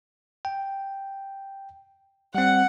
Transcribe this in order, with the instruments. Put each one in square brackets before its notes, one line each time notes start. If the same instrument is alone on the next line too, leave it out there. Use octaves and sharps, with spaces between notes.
[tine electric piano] G5
[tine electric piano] G3 C4 [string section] F#5